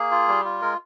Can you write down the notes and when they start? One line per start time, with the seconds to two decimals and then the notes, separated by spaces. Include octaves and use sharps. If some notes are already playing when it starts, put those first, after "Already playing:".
Already playing: A#3 G#4
0.11 F4
0.28 G3
0.44 F4
0.62 G#3 A#4